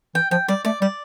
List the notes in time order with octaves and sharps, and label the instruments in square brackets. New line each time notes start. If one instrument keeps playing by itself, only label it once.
[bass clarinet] E3 [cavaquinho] G5
[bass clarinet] F3 [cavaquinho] G5
[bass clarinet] G3 [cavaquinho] D5
[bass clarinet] A3 [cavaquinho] D5
[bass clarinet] G3 [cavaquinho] D5